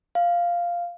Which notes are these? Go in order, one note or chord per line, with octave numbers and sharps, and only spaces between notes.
F5